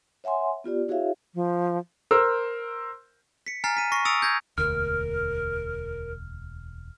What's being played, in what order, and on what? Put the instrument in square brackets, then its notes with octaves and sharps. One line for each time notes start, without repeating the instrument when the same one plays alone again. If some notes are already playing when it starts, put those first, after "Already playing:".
[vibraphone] C#5 E5 F#5 G#5 C6
B3 F4 G4 D5
E4 F#4 G#4 C#5 E5 F5
[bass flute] F3
[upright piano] A#4 C5 E6
[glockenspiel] B6 C#7
G#5 A#5 F6 A6 C7
B6 D#7
C#6 A#6 C7
D#6 E6 A6 C#7 D7 F7
G6 G#6 A#6
[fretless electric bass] E1 D2 [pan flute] A#4 [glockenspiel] F6